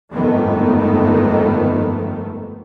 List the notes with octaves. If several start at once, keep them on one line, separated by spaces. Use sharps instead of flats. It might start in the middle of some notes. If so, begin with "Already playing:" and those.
G1 F2 G#2 D#3 A3 B3